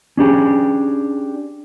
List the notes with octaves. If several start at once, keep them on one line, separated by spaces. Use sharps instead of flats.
C#4 D4 G4 G#4